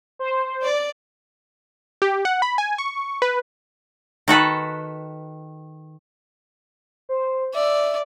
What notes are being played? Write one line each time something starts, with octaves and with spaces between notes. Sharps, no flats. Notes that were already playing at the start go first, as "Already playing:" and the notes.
C5
D5
G4
F#5
B5
G#5
C#6
B4
D#3 F#4 A4 B4
C5
D5 E5